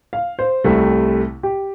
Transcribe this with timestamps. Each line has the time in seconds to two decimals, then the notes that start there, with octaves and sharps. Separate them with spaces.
0.13 F5
0.39 C5
0.64 C2 C3 A3
1.43 G4